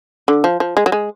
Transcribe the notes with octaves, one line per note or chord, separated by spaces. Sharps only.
D3
F3
F3
G#3
F#3
G#3